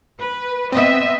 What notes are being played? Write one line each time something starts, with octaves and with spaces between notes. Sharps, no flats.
B4
B3 C4 D#5 E5